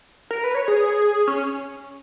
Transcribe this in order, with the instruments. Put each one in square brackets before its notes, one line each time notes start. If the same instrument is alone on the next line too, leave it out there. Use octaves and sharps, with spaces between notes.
[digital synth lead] A#4
B4
C#5
G#4
C#4